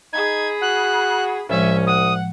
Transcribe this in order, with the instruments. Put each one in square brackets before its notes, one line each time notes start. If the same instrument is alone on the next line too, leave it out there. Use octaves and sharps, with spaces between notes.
[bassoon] D#4 [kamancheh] G#4 B5 [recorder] G#6
[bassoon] F#4 [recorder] F#6
[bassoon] C2 [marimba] A2 F3 G#3 [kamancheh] C#4 [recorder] E5
[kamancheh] F#5 [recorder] D#6